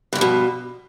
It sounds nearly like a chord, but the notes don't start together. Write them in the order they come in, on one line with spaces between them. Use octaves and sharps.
G2 E3 F3 B2